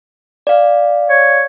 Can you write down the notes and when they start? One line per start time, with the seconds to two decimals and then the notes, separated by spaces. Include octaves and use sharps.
0.47 D5 F5
1.09 C#5